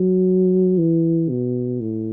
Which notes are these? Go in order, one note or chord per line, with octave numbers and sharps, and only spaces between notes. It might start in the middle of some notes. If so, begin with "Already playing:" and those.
Already playing: F#3
E3
B2
A2